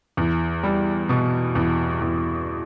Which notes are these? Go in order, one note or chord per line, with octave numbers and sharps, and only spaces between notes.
E2
G3
B2
E2
E2